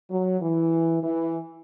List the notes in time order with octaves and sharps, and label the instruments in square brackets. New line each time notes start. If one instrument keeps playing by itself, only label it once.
[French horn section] F#3
E3
E3